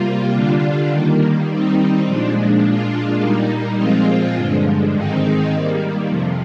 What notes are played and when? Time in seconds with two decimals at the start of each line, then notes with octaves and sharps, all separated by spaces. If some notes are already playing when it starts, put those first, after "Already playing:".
Already playing: C3 G3 A#3 F4
0.33 D3 G3 D4 F4
0.91 D#3 G3 A#3
1.48 D#3 G3 C4 D#4
2.05 A#2 F3 G#3 D4
2.64 A#2 G#3 D4 F4
3.21 A#2 G3 A#3 D#4
3.78 A#2 F3 G#3 C4 F4
4.36 G2 D3 F3 G#3
4.93 G#2 D#3 G#3 C4 D#4
5.51 D#3 G3 A#3
6.07 F2 C3 F3